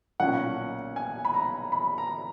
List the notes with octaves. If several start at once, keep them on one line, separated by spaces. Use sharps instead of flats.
B1 A#2 A#3 C#4 F#5
G#5
B5
A#5
B5
A#5